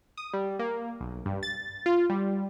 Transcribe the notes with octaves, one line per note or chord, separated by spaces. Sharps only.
D#6
G3
A#3
B1
G2
A6
F4
G3